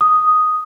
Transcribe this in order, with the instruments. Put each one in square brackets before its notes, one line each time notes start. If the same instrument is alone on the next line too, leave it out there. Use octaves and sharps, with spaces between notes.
[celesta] D#6